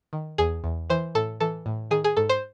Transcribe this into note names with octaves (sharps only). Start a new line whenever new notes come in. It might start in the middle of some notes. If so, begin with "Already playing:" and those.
D#3
E2 G#4
E2
E3 C5
A2 A4
E3 A4
A2
D#3 G#4
G#4
G#2 A4
C5